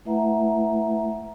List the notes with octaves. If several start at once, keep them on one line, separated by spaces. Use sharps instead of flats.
A3 E4 B4 E5 F#5 A#5